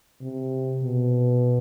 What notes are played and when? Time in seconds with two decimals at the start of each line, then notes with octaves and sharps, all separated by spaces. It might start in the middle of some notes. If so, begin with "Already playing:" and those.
0.22 C3
0.83 B2